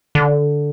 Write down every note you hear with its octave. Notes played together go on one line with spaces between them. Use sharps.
D3